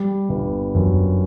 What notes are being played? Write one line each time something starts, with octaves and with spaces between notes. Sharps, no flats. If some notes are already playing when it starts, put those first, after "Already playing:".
Already playing: G3
G1
F#2